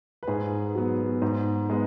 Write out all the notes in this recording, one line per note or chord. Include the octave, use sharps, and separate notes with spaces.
B4
G#2 G#4
F#3 B3
G#2
G#3 B3